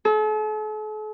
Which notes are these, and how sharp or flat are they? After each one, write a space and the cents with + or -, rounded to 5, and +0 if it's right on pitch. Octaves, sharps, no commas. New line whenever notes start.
A4 -45